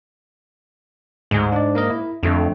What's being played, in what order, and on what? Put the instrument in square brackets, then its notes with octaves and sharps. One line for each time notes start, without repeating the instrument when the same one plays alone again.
[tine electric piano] D2 G#4 [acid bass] G#2
[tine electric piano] D4 D5
A#3 A#4 D#5
E4
[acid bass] F2 [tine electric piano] D3 F3 A3